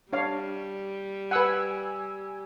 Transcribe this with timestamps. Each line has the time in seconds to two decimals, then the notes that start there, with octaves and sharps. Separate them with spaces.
0.13 G3 D4 C#5 F5
1.31 B4 F#5 G#5 E6 G#6